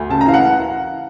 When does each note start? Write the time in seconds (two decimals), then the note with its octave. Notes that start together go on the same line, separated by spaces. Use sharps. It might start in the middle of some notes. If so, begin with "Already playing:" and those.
Already playing: D2
0.10 C#3 A5
0.21 A#5
0.28 E3 F5
0.34 F#5